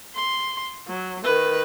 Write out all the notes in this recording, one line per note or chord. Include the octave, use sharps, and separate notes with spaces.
C6
F#3
D#3 B4